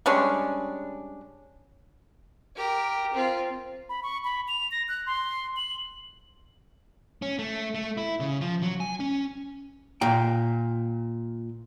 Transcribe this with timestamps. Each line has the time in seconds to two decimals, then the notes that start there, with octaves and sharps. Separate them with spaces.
0.06 G3 G#3 C#4 D4
2.56 G4 A#4
3.14 C4 F4
3.89 B5
4.03 C#6
4.24 B5
4.48 F7
4.71 A#6
4.88 F#6
5.06 C6
5.56 F#7
7.22 C#4
7.39 A3
7.75 A3
7.97 E4
8.20 C#3
8.41 F3
8.63 F#3
8.80 G#5
9.00 C#4
10.01 A#2 G5